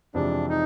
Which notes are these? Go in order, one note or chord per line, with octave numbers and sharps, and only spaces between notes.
F2 C3 E3 G#3 D4
D#4